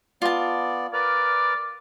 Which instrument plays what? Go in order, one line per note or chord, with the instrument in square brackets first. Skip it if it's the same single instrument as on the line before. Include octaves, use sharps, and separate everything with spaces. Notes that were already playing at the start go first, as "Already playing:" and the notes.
[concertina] B3 D5 [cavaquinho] F4 A5
[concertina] A#4 B4 F6 [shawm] D5